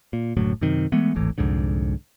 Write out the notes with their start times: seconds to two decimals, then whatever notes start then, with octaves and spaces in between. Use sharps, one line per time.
0.13 A#2
0.37 F#1 D2 A2 F#3
0.61 F#2 C3 D#3
0.92 E3 G#3 A3 B3
1.15 D1 G#1 A2 E3
1.38 C2 F2 G#2 D3